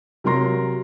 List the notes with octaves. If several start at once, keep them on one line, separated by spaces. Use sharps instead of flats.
C3 F#3 A#4 C6 A#6